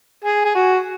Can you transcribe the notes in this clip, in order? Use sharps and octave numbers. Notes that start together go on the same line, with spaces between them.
G#4
G#4
F#4